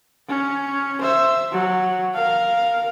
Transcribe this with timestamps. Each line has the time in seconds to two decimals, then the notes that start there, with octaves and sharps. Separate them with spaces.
0.28 C#4
1.02 C5 E5
1.52 F#3
2.15 A#4 F5